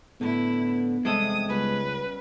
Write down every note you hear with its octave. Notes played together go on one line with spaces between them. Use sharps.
A2 D3 B3 E4
E2 C3 G3 G#3 A4 D#6
C#2 G3 B3 C#4 B4